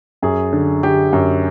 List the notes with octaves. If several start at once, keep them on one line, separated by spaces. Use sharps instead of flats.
F#2 G#4
D3
D3 G4
F#2